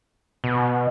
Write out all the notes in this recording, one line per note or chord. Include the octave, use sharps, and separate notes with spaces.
B2